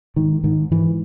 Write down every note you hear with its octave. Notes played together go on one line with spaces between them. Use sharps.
G#2 D#3
G#2 D#3
G#2 E3